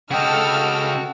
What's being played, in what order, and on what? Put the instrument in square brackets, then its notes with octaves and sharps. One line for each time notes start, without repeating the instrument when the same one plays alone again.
[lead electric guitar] C#3 D#5 [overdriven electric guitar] F#4 [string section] A4 E6 F6 [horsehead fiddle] G5